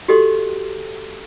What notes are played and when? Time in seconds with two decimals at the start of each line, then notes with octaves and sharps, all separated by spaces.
0.08 F#4 G4 A4 D#5 C6